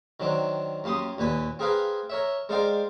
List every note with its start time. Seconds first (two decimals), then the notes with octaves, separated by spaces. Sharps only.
0.20 D#3 F#3 C4 D4
0.84 F#2 A#3 G4 C6 D#6
1.18 D#2 A#2 B4 G#5
1.59 C4 G#4 A#4 B4 F5
2.10 A#4 C#5 E5
2.49 G#3 A#4 C5 D5 F5 G5